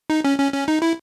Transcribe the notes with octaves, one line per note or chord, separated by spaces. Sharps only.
D#4
C#4
C#4
C#4
D#4
E4